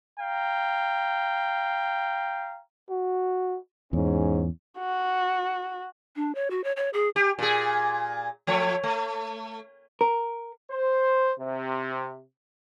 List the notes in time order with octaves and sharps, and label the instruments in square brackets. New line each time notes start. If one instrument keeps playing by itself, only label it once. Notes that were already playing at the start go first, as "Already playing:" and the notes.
[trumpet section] F5 G5 A#5
[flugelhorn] F#4
[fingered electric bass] E2 [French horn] G#2 [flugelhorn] C#4
[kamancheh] F#4
[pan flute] D4
C#5
F#4
C#5
C#5
G#4
[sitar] G4
A#2 G#4
F3 A3 C#5
A3
[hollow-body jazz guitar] A#4
[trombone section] C5
C3